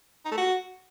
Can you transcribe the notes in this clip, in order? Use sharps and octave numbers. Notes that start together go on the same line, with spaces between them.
D#4
A3
F#4